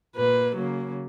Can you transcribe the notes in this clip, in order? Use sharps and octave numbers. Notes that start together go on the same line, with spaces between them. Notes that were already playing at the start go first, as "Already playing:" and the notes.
A#2 A#3 B4
C#3 F#3 A#3